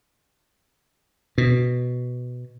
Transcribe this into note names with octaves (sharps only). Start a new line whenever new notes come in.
B2